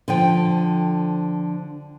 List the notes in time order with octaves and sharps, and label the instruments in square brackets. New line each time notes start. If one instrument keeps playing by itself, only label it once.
[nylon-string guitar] D3 F3 G5